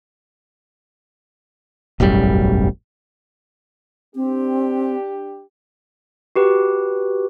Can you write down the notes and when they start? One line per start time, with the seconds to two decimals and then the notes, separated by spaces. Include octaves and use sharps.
2.00 E1 A1 F#2 G3
4.15 C4 D4 G4
6.36 F#4 G4 B4